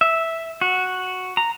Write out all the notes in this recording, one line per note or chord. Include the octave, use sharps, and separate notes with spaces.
E5
F#4
A#5